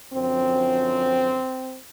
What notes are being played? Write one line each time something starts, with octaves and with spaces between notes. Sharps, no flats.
F#2 D3 F3 C4